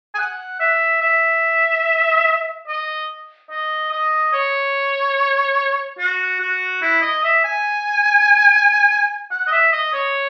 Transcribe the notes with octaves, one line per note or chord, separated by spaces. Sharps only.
G#5
F#5
E5
E5
D#5
D#5
D#5
C#5
F#4
F#4
E4
D#5
E5
G#5
F#5
D#5
E5
D#5
C#5